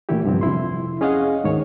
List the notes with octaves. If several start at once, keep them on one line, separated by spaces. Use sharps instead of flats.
A#2 D3 E3 A3 E4 G4
C2 G2 D3 F3 C4
F2 C3 E4 C6
C#4 G#4 C#5 D#5 F5 F#5
D2 G#2 D#3 C#5